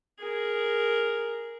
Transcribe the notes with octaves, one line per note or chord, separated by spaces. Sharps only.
G#4 A#4